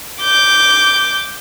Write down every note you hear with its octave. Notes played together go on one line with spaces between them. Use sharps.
D6 G6